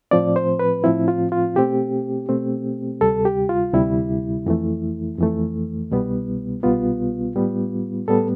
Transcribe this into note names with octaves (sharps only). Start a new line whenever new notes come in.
A2 F3 C4 D5
C5
B4
A2 F3 C4 E4
F4
F4
B2 A3 C4 G4
B2 A3 C4
D2 C3 G3 A4
G4
F4
D2 C3 G3 E4
F2 E3 A3
F2 E3 A3
C2 B2 G3 B3
C2 B2 G3 B3 F4
A2 G3 B3
A2 G3 B3 A4